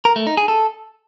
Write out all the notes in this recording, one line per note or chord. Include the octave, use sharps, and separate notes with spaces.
A#4
A3
D#4
G#4
A4